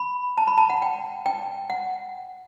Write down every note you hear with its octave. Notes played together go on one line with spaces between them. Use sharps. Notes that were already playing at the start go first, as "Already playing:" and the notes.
Already playing: B5
A5
B5
A5
F#5
G5
G5
F#5